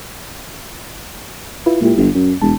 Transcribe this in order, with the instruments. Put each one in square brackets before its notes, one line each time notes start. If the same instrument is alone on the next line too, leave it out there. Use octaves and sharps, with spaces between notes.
[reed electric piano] E4 F4 B4
[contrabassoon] A#2 [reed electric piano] G#3 E4 G4
[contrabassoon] G1
[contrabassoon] F#2 [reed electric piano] C#4
[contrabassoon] E1 [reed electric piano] F#2 G#3 A5